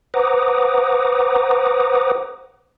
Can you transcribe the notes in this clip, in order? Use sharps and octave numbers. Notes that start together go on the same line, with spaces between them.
B4 C5 F#5 A#5 D6 D#6